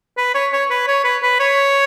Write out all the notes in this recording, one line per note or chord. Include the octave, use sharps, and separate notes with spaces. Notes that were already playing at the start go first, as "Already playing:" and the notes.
B4
C#5
C#5
B4
C#5
B4
B4
C#5